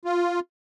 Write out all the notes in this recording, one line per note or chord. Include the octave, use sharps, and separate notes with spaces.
F4